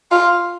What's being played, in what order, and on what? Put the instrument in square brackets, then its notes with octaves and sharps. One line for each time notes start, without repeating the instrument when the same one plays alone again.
[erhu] F4